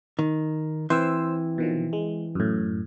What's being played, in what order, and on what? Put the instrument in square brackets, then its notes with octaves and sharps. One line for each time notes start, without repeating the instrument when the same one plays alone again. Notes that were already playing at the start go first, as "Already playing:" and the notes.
[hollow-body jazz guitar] D#3
[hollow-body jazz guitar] E3 C4 [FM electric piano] C5 E6
[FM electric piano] B2 D#3 F3
G#3
F#2 A2